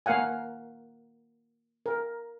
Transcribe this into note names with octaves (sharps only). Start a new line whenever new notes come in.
A#3 A#4 F5 F#5 G#5
A#4